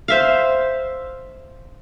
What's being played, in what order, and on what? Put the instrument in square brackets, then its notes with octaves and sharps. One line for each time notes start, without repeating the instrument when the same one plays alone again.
[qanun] C5 E5 F5